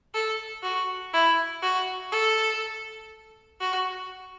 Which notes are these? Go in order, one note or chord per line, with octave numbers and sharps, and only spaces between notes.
A4
F#4
E4
F#4
A4
F#4